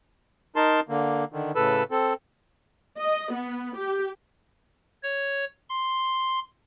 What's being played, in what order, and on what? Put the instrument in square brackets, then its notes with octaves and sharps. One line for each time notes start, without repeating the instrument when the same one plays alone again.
[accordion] D#4 A#4 A5 C6
D3 A#3
D3 D#3
A2 C#3 A4 B4 E6
C4 A4
[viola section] D#5
B3
G4
[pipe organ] C#5
C6